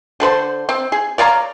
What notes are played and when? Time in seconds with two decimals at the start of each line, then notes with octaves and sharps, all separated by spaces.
0.20 D3 A4 B4 C5
0.69 C4
0.92 G#4
1.18 C#5 D5 F5 A#5